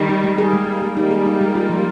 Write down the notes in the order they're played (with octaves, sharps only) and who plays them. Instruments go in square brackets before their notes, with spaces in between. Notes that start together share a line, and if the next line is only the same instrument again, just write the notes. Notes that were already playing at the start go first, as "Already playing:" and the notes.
Already playing: [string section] D#3 G3
[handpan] D#4
G#3
[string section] G3 A#3 [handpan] G#4
[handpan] G#3
G#3
G#3
[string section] G3 A#3 [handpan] D#4
[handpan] G#4
D#4
G#3
F4
F3